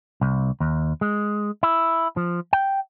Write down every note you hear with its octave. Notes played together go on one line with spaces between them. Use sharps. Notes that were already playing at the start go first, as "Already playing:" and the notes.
C2
D#2
G#3
E4
F3
G5